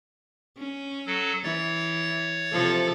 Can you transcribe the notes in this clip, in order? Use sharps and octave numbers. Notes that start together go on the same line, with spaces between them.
C#4
F#3 A4
E3 C#5 A6
C3 F3 A4